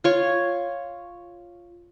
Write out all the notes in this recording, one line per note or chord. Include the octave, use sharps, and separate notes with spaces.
F4 C#5